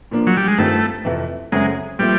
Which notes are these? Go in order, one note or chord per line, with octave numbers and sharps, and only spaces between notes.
A#2 F3 A#3 D4
F#3
G3
G#3
G2 D#3 G3 A3 C4 F4
F2 C3 E3 A3
F#2 C#3 F#3 G#3 A3 C4
A#2 F3 G3 A3 C4